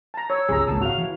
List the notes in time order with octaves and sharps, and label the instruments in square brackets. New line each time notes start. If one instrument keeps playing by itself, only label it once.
[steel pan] A5 A#5
[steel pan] C#5 [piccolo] E6
[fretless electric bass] G1 C#2 [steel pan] G#4 A#5
[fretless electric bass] G#1 C#2 A#2 [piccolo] A5
[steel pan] F#4 F5 [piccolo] F7
[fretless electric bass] E3